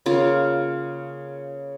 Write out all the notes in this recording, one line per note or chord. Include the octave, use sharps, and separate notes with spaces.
C#3 A#3 F4